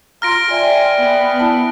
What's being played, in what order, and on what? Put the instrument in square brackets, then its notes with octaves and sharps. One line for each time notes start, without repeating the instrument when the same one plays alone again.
[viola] F4 [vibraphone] A#5 C6 [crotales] F6 A#6 D7
[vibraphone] D5 E5 G5 [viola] G#5
[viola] B3
[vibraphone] E4 A5